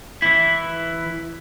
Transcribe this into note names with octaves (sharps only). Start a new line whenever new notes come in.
E3 E4